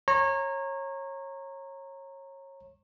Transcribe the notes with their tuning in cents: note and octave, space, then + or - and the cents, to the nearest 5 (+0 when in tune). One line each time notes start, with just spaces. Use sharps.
C#5 -25 A#5 -10